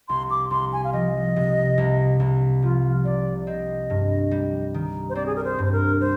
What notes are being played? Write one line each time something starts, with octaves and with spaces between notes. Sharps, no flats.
C2 C6
D6
C2 C6
G#5
F5
F3 D#5
C3
C2
C2
F3 F4
C3 D5
C4 D#5
G2
G3
D#3
C5
C4 D5
G#4
A#4
C5
G2
C5
A#4
G3 C5